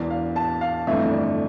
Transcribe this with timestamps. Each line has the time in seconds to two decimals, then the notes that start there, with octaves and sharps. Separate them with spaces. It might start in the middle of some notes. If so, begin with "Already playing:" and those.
Already playing: E1 E2 E3 D5
0.10 F5
0.36 A5
0.61 F5
0.87 G1 F2 E3 A3 E5
1.12 D5